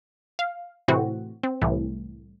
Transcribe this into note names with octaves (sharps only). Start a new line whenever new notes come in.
F5
A2 C3 E3 C4 F#4
C4
C2 A2 E3